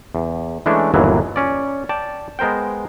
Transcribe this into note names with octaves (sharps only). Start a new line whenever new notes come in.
E2
E3 G#3 A3 C#4 D4
G1 D#2 A#2 D#3 E3 F#3
C#4 D5
D5 G5 A5
G#3 B3 A#4 C5 G5